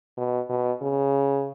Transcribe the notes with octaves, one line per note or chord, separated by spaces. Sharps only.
B2
B2
C#3